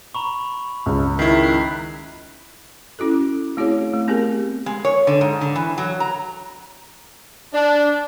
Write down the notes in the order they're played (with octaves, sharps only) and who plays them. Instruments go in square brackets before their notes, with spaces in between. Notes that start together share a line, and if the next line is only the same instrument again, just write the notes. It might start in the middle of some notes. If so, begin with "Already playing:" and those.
[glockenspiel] A#5 B5 C#6
[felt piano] C#2
[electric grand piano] D#3 E4 [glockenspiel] B6 C7
[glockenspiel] B5 F#6
[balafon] C#4 E4 F#4 A4
A3 C4 E4 F#4 G#4 C#5
A3
B3 C4 G4 G#4 A#4
[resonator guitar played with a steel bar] G#3
C#5
D3
G#2
D3
E3
F#3
A#5
[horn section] D4